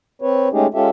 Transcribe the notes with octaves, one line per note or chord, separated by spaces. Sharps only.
C4 B4 C#5
G#3 A3 C#4 D#4 G4 G#4
G#3 C#4 F4 G4 A4 E5